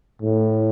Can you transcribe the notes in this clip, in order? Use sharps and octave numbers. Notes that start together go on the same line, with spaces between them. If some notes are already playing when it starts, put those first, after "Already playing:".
A2